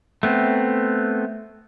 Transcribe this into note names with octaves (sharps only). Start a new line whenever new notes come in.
A3 B3 C4